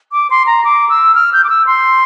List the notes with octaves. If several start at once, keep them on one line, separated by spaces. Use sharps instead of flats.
D6
C6
A#5
D6
E6
F6
G6
D6
E6
C6